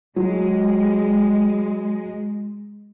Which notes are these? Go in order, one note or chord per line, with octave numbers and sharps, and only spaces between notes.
F#3 G#3